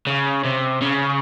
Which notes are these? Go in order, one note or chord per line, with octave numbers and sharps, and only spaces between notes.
C#3
C3
C#3